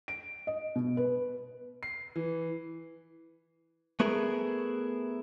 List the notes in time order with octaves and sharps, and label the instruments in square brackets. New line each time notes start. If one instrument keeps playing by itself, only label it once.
[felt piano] D7
D#5
B2
B4
[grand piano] C7
E3
[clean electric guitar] A3 B3 E4 G#4 A#4